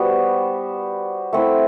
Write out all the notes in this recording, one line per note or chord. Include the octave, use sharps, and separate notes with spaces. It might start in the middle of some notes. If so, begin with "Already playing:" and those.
Already playing: G3 B3 F#4 C5
A3 C4 E4